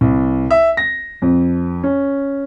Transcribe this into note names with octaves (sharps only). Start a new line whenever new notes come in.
C2
E5
A#6
F2
C#4